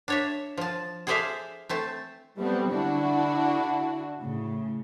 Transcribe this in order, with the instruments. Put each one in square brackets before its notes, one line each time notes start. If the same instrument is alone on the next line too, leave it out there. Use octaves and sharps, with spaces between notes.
[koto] D4 C#5 E5
F3 A5
G#4 A4 C5 D5 E5 F5
A3 C4 A5
[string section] F#3 G3 A3 B3 C4
D3 D4 E4 F#4
A2 C#3